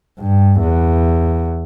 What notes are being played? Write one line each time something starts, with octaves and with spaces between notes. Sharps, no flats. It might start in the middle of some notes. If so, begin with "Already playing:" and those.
G2
E2